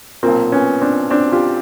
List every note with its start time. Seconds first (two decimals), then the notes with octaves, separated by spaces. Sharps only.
0.23 B1 A#2 A#3 C4
0.52 B3 C#4
0.81 C4 D4
1.11 C4 D4
1.32 F4 G4